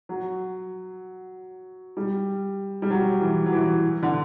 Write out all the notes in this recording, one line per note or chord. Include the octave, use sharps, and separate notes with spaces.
F#3
G3
G3
F#3
E3
F#3
E3
D3